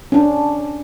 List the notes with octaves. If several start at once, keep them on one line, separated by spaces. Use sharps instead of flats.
C#4 D4